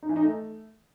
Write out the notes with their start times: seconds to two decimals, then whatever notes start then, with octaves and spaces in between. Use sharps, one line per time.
0.03 D#4
0.09 E3
0.16 D#4
0.23 A3